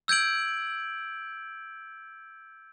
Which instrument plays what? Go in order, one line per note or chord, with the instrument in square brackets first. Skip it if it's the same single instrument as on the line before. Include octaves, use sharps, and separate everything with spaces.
[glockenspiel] E6 G6 G#6 D7 F#7